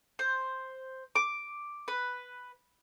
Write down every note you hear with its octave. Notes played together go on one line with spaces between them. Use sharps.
C5
D6
B4